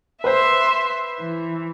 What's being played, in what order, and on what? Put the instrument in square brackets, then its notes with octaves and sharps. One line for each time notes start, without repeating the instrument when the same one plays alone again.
[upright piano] B4 C5 [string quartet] E5 C6
[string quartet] E3